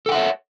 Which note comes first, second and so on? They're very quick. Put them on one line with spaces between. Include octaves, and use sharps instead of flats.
A4 G5 F#5 E5 C#5